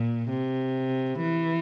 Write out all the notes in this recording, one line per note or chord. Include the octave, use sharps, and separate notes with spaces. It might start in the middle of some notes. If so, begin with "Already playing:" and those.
Already playing: A#2
C3
E3